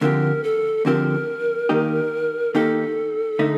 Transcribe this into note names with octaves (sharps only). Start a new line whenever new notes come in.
D2 D3 F3 C4 G4 A#4
A4
D2 D3 F3 C4 G4 A#4
D#2 D#3 A#3 D#4 G4
D#2 D#3 A#3 D#4 G4 A4
D3 A3 D#4